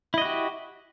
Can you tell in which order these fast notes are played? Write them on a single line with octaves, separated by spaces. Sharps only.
E4 D#5 F#4 G4